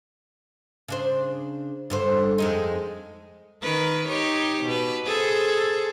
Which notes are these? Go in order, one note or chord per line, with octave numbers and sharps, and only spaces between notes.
C#3 D4 C5
G2 D3 C5
F2 G#3 D#4
D#3 A#4 B4
D#4 G4 C#5
B2 B4
G#4 A4 C5